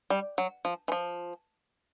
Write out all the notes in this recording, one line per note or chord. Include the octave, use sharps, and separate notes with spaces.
G3
F#3
F3
E3
F3